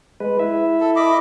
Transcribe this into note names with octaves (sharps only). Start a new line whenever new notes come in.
G#3 B4
E4 E5
A4
D#5 B5 D6